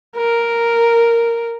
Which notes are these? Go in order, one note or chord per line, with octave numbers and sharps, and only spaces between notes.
A#4